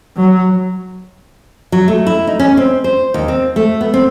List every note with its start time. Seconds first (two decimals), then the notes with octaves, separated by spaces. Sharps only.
0.17 F#3
1.72 F#3
1.88 A3
2.06 E4
2.27 D#4
2.39 C#4
2.57 C4
2.84 C5
3.14 D#2
3.28 C4
3.56 A3
3.81 B3
3.94 C4